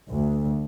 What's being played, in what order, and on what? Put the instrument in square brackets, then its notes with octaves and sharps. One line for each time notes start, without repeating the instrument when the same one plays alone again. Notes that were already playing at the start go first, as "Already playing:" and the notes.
[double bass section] D2